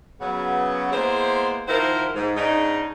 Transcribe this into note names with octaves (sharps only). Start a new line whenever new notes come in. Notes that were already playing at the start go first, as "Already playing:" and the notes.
C#3 F#3 B3
G#3 A#3 B3 E4 C5
D#3 F3 E4 F#4 A#4 C5
G#2
G#2 C#3 D4 D#4